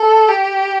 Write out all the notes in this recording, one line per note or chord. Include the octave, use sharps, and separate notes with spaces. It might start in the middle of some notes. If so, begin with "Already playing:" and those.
Already playing: A4
G4